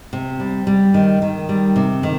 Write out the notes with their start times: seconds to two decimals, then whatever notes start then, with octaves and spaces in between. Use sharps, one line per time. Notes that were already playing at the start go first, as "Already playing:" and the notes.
0.13 C3
0.40 G3
0.67 G3
0.94 D#3
1.22 D#3
1.49 G3
1.76 C3
2.03 D#3